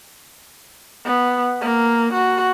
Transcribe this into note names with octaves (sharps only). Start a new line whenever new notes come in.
B3
A#3
F#4